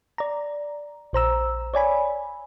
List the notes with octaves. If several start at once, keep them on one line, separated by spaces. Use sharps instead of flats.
D5 A#5
A#1 C5 A#5 E6
C#5 D5 G#5 B5